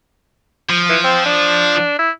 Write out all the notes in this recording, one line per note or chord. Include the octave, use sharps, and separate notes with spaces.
F3
E3
C4
D4
E4